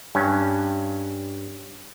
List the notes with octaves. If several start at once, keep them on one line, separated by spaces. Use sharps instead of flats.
G2 C#4